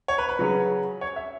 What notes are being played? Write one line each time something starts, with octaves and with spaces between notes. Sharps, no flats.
C#5
B4
B4
C#3 F#3 C#4
C#5
E5